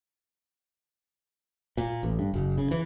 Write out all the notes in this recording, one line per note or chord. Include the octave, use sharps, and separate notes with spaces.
A#2
A1
G2
F#1
C#3
E3